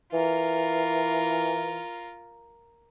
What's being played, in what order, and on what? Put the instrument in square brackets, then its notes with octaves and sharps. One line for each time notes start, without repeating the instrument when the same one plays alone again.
[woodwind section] E3 [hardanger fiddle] F4 A#4